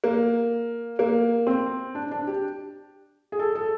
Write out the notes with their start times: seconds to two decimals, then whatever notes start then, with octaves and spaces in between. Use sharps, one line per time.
0.04 A#3
0.99 A#3
1.47 C4
1.95 D4
2.11 D4
2.27 G4
3.32 G#4
3.39 A4
3.55 A4